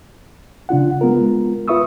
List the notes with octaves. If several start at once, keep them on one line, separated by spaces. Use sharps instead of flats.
C#3 D4 F4 F#5
G#3 B3 F4 A#4
F4 B4 E5 C#6 D#6 E6